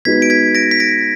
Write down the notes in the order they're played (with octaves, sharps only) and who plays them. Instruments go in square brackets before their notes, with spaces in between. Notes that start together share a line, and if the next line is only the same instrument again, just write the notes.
[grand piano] G#3 B3 D#4 F#4 B4 [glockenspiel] G#6 B6
[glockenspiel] D7
G#6 B6
A#6 D7
B6
A#6 D7